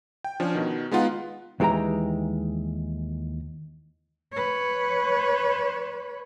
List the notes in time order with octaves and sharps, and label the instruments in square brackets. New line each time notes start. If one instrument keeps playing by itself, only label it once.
[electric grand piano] G5
F3 C#4 D4
B2 D#3
G#3 B3 D#4 F4 F#5
[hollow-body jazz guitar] D#2 E3 G#3 G5 A#5
[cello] B4 C#5